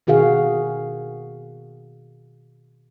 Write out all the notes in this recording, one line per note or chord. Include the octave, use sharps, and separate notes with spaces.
B2 D#3 F#4 G#4 F5